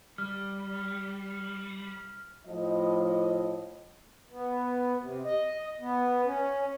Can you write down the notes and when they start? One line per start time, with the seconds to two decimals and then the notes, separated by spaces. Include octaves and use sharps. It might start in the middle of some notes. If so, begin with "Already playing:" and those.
0.18 G3 F6
2.46 A2 F3 D#5
4.31 B3
5.00 C3
5.25 D#5
5.80 B3
6.25 C#4